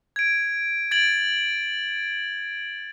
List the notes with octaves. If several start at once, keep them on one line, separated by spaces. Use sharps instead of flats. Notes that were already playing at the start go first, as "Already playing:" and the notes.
G#6 D7
G#6 A6 D7 F#7